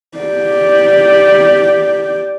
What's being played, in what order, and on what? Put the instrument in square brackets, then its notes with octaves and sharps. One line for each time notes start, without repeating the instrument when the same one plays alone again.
[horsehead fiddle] G4 D5